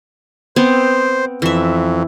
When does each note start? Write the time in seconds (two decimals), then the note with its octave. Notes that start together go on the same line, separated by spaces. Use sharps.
0.56 B3 C4 C5
1.42 F2 E3 E5